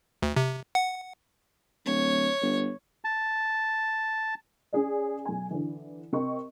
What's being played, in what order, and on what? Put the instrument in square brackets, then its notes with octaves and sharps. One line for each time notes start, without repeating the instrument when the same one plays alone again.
[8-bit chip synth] D2
C3
F#5
[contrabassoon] D1 [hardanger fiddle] C#5
[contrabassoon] G1
[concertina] A5
[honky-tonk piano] C#4 G#4 D5
B1 G#5
D3 E3
C3 C4 A#4 D#5 C#6